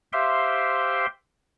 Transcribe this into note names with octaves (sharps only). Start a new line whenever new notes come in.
G4 C5 E5 F5 G5 C6